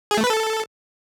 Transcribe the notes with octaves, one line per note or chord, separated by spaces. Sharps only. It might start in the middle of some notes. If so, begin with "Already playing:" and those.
G#4
A3
B4
A4